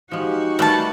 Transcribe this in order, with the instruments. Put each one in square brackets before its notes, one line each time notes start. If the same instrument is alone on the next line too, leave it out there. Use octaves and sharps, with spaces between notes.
[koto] F3 G#3 [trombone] D#4 [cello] F#4 G4
[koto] D#3 G3 A3 [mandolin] B4 A5